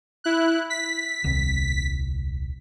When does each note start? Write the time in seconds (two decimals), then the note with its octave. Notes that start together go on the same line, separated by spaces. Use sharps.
0.24 E4 F#6
0.70 B6
1.24 D#1 C2